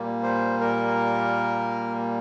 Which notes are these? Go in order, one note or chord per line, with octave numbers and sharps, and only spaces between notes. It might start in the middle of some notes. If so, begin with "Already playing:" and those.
Already playing: A#2 G3 A#3
C5
A#4